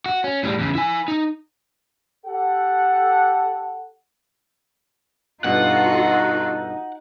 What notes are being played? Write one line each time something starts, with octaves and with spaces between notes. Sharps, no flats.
F#4
C#4
A2 G3
E2 C#3
E4 G#5
D#4
G4 A4 F#5
G2 B2 D#4 F4 F#4 A4 F#5